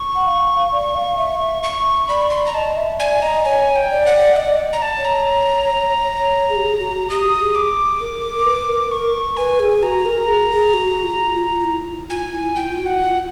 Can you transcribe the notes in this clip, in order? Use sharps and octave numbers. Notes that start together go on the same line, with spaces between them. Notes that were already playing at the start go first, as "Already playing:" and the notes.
Already playing: C#6
F#5
F5
D5
F5
E5
E5
C#6
D5 B5
C#6
C6
B5
A#5
D#5 A5
E5
D5 G#5
D#5 A#5
C#5 G#5
G5
D5
F#5
D5 D#5
A#5
A5
C#5
A#5
C#5
G#4
G4
G#4
F#4
G4 D#6
G#4
D6
A#4
A#4
A#4
B4
A#4
A#4 C#6
B4 G#5
G#4
F#4 A#5
A#4
G#4
G#4
F#4
F4
F4
F4
E4
F4 G#5
E4
E4 G5
F4
F#4
F#5
F4